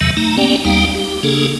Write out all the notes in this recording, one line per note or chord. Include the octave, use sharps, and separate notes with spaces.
E2 C3 D#3 F#3 E5 A5
A3 D#4 A#5
A#3 B3 C#4 G4 D5 G5
D#2 G3 D#4 F5 G5
G4
C#3 A#3 D4 G#4 A4